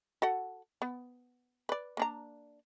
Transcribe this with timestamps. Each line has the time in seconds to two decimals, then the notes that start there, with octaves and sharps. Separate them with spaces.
0.22 F#4 A4 F#5
0.82 B3
1.69 B4 D5
1.97 A#3 D4 A#5